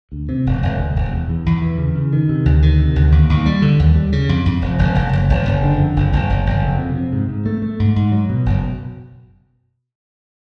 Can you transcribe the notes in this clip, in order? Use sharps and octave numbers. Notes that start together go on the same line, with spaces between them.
D2
C3
E1
E1
D2
E1
E2
E2
E2
E3
C#3
C#3
D#3
C3
D2
D#3
C3
D2
D#2
D#2
G3
D3
D#2
G3
C#3
F2
F2
F1
F1
F1
F#1
F#1
F#1
D3
F2
F#1
F#1
F#1
F#1
F2
C3
C3
G#2
G#2
A3
A3
G#2
G#2
F#3
B2
F#1